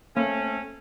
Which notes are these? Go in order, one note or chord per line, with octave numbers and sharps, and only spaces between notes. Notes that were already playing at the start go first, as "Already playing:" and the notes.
A3 A#3 C4 C#4